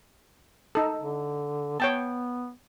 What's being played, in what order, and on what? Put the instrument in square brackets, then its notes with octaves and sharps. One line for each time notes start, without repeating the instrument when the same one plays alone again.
[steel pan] D#4 A4
[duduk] D3
[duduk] B3 [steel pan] C#5 G5 A5